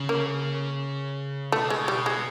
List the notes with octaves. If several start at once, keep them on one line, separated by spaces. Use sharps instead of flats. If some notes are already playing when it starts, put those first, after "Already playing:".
Already playing: C#3
A#3
B2 A3
G#3
G3
G#3